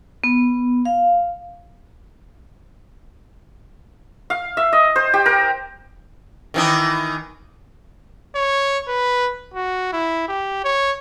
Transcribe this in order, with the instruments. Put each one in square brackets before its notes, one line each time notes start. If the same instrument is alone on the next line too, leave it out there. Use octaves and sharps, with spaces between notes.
[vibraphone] B3
F5
[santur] F5
E5
D#5
C5
G4
A#4
[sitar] D#3 E3 D#4
[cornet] C#5
B4
F#4
E4
G4
C#5